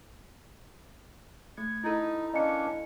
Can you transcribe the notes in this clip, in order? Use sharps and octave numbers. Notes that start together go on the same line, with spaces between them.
A3 G#6 C#7
D#4 E4 A4
A#3 C#4 D4 D#5 C#7